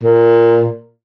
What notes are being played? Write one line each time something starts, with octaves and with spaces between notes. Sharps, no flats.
A#2